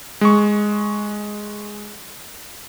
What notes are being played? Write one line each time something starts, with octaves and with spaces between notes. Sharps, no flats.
G#3 C#6